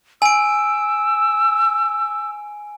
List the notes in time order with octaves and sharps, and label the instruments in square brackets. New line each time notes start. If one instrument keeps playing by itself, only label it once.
[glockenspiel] G#5 D7 [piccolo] E6